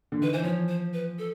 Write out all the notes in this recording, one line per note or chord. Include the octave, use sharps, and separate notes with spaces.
D3
D#3 B4
E3 C5
F3 C#5
C5
B4
A4